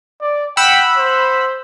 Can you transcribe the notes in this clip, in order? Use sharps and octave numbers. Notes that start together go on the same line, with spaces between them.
D5
F#5 G5 B5 E6
C5